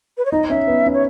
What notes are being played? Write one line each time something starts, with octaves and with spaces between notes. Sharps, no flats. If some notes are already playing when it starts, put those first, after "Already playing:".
B4
C#5
D#4 D#5
C#4 E5
B3
C#4
C#5